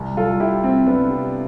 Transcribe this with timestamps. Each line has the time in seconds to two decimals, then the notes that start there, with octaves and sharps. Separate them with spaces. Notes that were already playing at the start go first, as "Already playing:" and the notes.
Already playing: C2
0.17 C2 F4 A4
0.40 C2 E4 G4
0.64 C3 C4
0.87 C2 B3 D4
1.10 C3